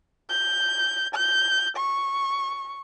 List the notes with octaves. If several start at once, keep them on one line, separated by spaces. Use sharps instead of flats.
G6
G6
C#6